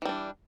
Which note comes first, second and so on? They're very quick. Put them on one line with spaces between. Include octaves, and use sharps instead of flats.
E3 G3 D4